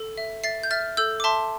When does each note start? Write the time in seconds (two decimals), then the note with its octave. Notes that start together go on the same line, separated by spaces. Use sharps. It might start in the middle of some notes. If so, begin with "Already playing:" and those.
Already playing: A4
0.17 E5
0.43 E5 A6 C7
0.63 G6
0.71 E5 F6 A6
0.97 A4 E6 G6
1.20 D6
1.24 E5 A5 C6